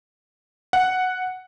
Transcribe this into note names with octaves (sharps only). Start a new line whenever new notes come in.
F#5